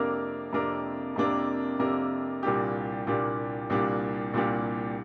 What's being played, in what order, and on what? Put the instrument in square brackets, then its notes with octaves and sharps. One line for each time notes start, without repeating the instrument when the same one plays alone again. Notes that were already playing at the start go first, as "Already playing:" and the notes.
Already playing: [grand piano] F2 C3 A#3 D4 A#4
F2 C3 A#3 D4 A#4
F2 C3 A#3 D4 A#4
F2 C3 A#3 D4 A#4
C2 A#2 A#3 D4 G4
C2 A#2 A#3 D4 G4
C2 A#2 A#3 D4 G4
C2 A#2 A#3 D4 G4